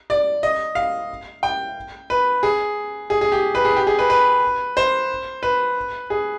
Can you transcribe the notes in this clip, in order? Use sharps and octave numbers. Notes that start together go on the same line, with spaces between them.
D5
D#5
F5
G5
B4
G#4
G#4
G#4
G4
B4
G#4
G4
G#4
B4
B4
C5
B4
G#4